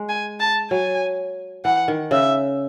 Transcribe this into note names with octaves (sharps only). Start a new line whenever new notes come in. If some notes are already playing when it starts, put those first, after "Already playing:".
Already playing: G#3
G#5
A5
F#3 G#5
E3 F#5
D#3
C#3 E5